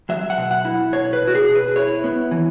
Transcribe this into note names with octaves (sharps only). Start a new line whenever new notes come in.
F#3 E5
F#5
B2
F#5
E4
B2 C#5
B4
B2
F#4
G#4
B2
B4
E4 C#5
B3
E3